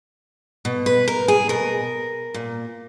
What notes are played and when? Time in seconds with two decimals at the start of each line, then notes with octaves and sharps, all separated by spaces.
0.65 B2
0.86 B4
1.08 A#4
1.28 G#4
1.49 B2 A#4
2.34 A#2